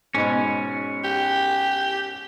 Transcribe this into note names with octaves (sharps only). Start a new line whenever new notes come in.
G#2 B2 C#4
G4